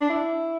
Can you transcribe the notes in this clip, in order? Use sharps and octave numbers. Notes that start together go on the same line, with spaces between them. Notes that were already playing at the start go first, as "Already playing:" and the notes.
D4
E4